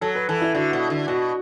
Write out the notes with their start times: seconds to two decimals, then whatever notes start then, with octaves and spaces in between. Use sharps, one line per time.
0.01 F#3 A4
0.15 B4
0.28 E3 A4
0.42 E4
0.55 D3 F#4
0.73 B2
0.90 D3
1.08 B2 F#4